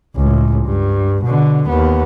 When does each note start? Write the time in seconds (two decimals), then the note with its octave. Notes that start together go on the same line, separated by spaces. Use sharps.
0.16 C#2 A2
0.66 G2
1.24 B2 D3
1.68 D#2 B3